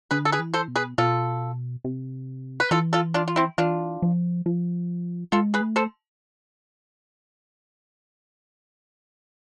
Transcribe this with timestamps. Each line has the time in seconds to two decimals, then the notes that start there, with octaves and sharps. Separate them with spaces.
0.11 D3 G#4 B4
0.25 A4
0.32 G#4 B4
0.39 E3
0.54 A4 C5
0.68 B2
0.76 G#4 B4
0.98 B2 F4 A4
1.84 C3
2.60 B4
2.71 E3 F4 A4
2.93 F4 A4
3.14 D4 F4
3.28 F4
3.36 C4 E4
3.58 E3 D4 F4
4.02 F3
4.46 F3
5.32 G#3 F4 A4
5.54 G#4 B4
5.61 A3
5.76 A4 C5